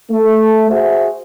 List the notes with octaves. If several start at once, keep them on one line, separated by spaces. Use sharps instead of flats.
A3
F#4 G#4 C5 E5